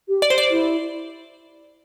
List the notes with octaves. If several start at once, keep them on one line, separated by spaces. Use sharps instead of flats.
G4
D5
C5
D5
E4